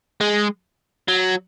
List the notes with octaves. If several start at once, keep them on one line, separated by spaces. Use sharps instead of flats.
G#3
F#3